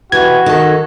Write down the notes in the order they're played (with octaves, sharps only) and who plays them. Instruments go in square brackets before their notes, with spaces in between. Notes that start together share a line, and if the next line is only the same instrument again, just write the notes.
[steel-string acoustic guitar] C3 E3 [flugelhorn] F#4 [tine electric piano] G#6
[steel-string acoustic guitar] D#3 A4